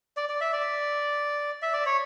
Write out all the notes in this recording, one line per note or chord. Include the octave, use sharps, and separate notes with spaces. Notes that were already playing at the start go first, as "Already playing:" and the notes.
D5
D5
E5
D5
E5
D5
C#5